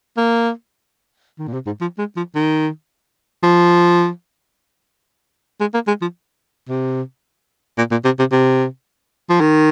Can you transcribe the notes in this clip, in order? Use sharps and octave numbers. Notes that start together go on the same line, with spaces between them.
A#3
D#3
A#2
C3
G#2
F3
G#3
F3
D#3
F3
G#3
A#3
G#3
F3
C3
A#2
A#2
C3
C3
C3
F3
D#3